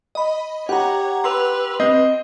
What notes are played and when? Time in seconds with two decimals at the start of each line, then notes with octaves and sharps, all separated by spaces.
0.15 D#5 B5
0.69 G4 C#5 F#5 A#5
1.24 B4 C6 E6 F7
1.80 C4 D#5